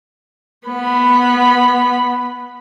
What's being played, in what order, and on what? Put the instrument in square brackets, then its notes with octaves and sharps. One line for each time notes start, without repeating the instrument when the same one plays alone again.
[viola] B3 B5